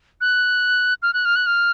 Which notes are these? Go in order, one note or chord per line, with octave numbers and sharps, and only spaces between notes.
F#6
F6
F#6
F6
F#6
F6